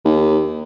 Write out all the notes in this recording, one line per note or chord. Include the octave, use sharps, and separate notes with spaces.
D#2